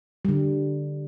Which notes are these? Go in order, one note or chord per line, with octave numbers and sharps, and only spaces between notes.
D3 G3